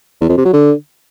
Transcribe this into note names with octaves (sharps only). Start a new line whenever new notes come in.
E2
F2
C3
F#3
D3